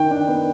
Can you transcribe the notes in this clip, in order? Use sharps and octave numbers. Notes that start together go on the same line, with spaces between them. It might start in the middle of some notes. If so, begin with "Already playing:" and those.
Already playing: D#3 G5
D4
B3